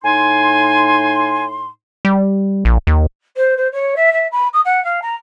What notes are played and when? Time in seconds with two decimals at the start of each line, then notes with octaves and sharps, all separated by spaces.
0.04 A2 D#4 G#5 C6
2.05 G3
2.65 A#1
2.87 D#2
3.36 C5
3.57 C5
3.72 C#5
3.96 E5
4.13 E5
4.31 B5
4.53 D#6
4.65 F#5
4.84 F5
5.02 A#5